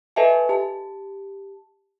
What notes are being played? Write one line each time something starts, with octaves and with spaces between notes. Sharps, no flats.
A4 B4 D#5 E5 G#5 A5
G4 A5